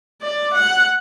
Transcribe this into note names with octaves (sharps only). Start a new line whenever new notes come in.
D5
F#5